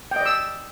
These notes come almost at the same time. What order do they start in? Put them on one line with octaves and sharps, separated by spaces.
G5 D#5 D5 E6